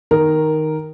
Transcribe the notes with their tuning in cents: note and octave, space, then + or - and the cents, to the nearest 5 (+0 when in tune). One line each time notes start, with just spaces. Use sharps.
D#3 +0 A#4 +0